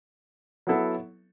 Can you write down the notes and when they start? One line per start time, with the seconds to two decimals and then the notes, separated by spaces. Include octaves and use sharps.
0.67 F#3 B3 E4 A4